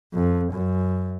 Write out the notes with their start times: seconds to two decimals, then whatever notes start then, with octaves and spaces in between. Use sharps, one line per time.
0.13 F2
0.52 F#2